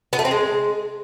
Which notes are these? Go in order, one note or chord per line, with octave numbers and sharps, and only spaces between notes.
B3
A3
C4
G#3